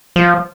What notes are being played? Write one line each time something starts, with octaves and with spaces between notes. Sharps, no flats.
F3